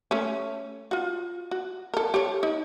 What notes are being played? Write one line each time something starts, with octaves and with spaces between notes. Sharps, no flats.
A3 C#4
F4 F#4
F#4
A4 A#4
G4 A4 C#5
D#4